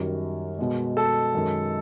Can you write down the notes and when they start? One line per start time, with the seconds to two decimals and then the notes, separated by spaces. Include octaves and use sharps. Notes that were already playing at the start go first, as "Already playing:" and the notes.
Already playing: F#2 D#3 G3 A#4
0.58 B2 G#3
0.97 A4
1.34 F#2 D#3 G#3